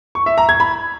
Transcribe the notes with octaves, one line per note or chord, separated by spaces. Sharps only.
C#6
E5
A#5
G#6
B5